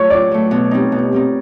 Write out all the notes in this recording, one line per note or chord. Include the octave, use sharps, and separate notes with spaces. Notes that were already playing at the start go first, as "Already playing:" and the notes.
Already playing: F#3 A3 C#5
A2 D5
F#3 A3
B2
G3 C4 D#4
B2
G3 C4 D#4